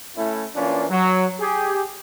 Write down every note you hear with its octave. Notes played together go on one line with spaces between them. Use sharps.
A3 C#4 E4
E3 A#3 C#4 D4 F4
F#3
G4 G#4